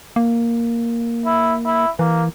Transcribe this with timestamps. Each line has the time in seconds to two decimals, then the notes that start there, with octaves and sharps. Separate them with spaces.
0.16 A#3
1.25 E4
1.65 E4
1.99 E3 A#3